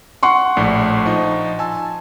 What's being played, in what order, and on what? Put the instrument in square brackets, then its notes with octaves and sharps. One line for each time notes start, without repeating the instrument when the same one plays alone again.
[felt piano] F#5 C6 C#6
[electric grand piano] A#1 A2 D5
F3 D#4 D#5
G#5 A5 E6